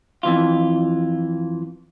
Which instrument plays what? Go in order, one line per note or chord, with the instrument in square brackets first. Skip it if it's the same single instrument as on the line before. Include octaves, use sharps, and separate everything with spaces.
[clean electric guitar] F2 E3 F4